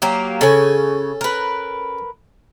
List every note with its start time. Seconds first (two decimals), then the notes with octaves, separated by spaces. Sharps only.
0.02 F#3 A#3 G4
0.41 C#3 C#4 A4 G#5
1.21 A#4 B4